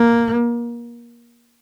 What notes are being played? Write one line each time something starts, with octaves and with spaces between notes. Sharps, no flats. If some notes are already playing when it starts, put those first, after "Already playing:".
Already playing: A#3